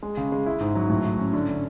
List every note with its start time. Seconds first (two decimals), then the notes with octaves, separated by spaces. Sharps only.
0.03 G#3
0.17 C#3
0.32 G#3
0.46 E4
0.60 G#2
0.75 F#3
0.90 A2
1.04 A2
1.19 C#4
1.34 D3
1.48 D3